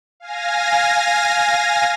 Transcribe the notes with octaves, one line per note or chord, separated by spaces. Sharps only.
F5 G#5 A#6